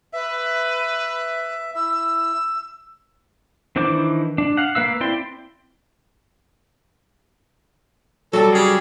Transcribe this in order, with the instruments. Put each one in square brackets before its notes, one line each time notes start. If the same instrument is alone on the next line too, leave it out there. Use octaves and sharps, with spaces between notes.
[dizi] B4 [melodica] E5
[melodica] E4 [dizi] E6
[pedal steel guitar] D#3 E3 D4 C5 D6
D4
F5 F#5
A#3 B4 F5 E6
C4 E4 D5 G5 C6
[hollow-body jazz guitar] F#3 G3 [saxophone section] A4
[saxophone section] C#3 G4 G#4